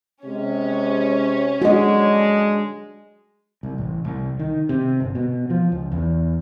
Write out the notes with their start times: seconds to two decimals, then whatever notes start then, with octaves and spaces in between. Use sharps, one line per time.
0.25 C3 G#3 C#4
1.62 A#1 D3 G#3 D4 F#4 D#5
3.63 C2
3.78 A1
4.05 C2
4.39 D#3
4.69 C3
5.00 G1
5.15 B2
5.50 F3
5.72 C#2
5.92 E2